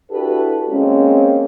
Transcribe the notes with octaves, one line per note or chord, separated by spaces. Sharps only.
D4 E4 F#4 G4 A4 B4
G#3 A#3 C4 C#4